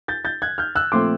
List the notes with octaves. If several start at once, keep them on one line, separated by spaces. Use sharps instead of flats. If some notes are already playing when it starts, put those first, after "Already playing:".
G6 A6
G6 A6
F#6 G#6
F6 G6
E6 F#6
A#2 F3 A3 C4 C6 D6